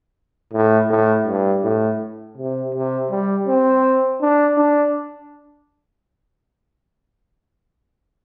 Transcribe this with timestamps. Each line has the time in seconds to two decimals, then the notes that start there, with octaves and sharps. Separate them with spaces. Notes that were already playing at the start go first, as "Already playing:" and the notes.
0.53 A2
0.90 A2
1.27 G2
1.64 A2
2.37 C3
2.74 C3
3.11 G3
3.48 C4
4.21 D4
4.57 D4